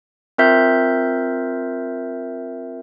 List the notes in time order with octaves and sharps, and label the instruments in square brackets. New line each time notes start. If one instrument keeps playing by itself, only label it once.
[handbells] C4 F4 A#4 E5 G6